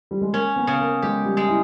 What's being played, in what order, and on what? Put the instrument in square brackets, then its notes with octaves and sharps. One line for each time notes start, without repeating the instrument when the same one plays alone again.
[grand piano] G3
G#3
[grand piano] A#3 [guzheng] C#4
[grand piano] B3
[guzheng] C#3
[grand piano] A#3
[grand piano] G#3 [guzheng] G4
[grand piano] G3
[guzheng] G#3
[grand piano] E4